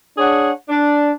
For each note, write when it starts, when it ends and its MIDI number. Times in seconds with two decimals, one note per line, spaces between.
0.18 0.51 62
0.18 0.51 68
0.18 0.51 73
0.18 0.51 78
0.69 1.11 62